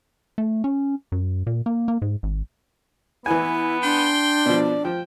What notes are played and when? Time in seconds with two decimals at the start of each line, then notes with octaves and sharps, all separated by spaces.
0.38 A3
0.64 C#4
1.12 F#2
1.47 A#2
1.66 A#3
1.88 A#3
2.02 G#2
2.23 G#1
3.26 E3 B3 E4 G#5
3.83 D4 G5 C6
4.46 B2 F3 D5
4.85 F3 G5